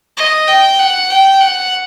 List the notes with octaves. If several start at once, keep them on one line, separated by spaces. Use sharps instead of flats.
D#5
G5
F#5
G5
F#5